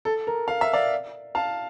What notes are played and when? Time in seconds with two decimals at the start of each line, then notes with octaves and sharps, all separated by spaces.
0.05 A4
0.27 A#4
0.48 F5
0.61 E5
0.73 D5 F5
1.35 F5 A5